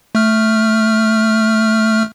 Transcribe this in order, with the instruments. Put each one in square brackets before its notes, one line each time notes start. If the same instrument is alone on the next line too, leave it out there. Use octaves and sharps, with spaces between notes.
[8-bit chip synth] A3 F6